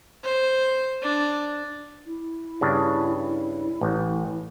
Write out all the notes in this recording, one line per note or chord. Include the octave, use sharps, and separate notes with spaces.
C5
D4
E4
G2 C#3 D4
A1